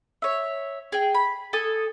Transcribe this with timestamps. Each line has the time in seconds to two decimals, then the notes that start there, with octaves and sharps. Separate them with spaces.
0.22 C#5 E5
0.92 G#4 G5
1.15 B5
1.53 A4 G#5 D#6